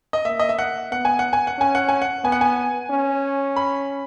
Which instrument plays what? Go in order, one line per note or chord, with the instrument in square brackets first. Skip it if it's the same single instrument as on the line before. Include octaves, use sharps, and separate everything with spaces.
[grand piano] D#5
[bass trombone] A#3 [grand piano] E5
[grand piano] D#5
E5
F#5
[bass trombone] B3 [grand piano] F#5
[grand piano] G#5
F#5
G#5
F#5
[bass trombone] C#4 [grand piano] G#5
[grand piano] F#5
G#5
F#5
[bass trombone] B3 [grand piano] G#5
[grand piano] F#5
G#5
[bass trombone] C#4
[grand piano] B5